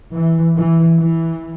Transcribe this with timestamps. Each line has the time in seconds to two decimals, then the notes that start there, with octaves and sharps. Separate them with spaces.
0.15 E3
0.56 E3
0.97 E3